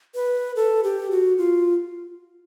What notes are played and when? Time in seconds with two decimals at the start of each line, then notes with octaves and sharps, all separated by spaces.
0.15 B4
0.56 A4
0.84 G4
1.11 F#4
1.38 F4